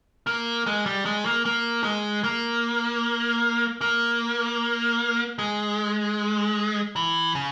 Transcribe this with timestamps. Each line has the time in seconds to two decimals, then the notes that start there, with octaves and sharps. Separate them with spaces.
0.27 A#3
0.67 G#3
0.86 G3
1.05 G#3
1.26 A#3
1.45 A#3
1.84 G#3
2.24 A#3
3.81 A#3
5.39 G#3
6.96 E3
7.35 C#3